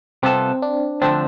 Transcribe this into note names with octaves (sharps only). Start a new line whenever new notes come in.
C3 G3 B3 C4 F4 A4
D4
D3 F3 A3 C4 D4